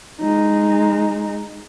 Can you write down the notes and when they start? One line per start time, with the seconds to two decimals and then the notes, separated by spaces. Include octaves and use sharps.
0.21 G#3 D#4